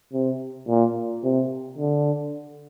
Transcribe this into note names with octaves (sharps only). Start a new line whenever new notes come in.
C3
A#2
C3
D3